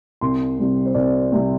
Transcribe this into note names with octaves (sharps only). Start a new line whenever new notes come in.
C2 C6
C3 G3
C5
C2 D5
C3 G3